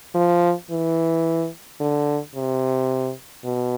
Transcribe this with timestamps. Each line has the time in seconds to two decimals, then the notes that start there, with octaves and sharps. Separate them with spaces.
0.15 F3
0.71 E3
1.80 D3
2.35 C3
3.44 B2